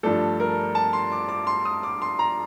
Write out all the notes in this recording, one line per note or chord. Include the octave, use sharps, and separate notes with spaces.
G2 F3 A3 D4 A4
A#4
A5
C6
D6
D6
C6
D#6
D6
C6
A#5